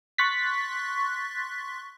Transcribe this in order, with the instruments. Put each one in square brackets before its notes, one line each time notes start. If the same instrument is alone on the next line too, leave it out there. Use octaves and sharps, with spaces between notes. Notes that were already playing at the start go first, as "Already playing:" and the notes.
[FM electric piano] C6 C#6 F#6 A6 B6